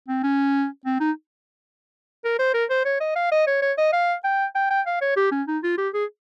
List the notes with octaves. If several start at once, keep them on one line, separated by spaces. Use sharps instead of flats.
C4
C#4
C4
D#4
A#4
C5
A#4
C5
C#5
D#5
F5
D#5
C#5
C#5
D#5
F5
G5
G5
G5
F5
C#5
G4
C#4
D#4
F4
G4
G#4